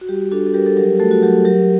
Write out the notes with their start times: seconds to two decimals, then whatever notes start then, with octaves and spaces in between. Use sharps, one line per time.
0.01 F#4
0.09 G3 G4
0.32 D4 F#4 A4
0.47 A4
0.54 G3 G4 A#4
0.66 A4
0.77 F#3 G4 A#4
1.00 A3 F#4 A4
1.11 F#4
1.23 F#3 G4
1.45 F#3 G4 A#4